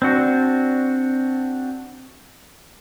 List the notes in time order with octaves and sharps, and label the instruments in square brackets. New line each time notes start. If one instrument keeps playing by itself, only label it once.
[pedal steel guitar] C4 D4 F#4